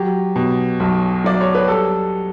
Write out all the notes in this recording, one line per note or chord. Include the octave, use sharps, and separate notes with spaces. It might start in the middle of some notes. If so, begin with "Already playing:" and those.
Already playing: F#3 G4
B2
B1
F#3 D5
C#5
B4
G3 A4